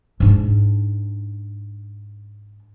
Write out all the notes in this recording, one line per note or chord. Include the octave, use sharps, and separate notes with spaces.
G#2 D4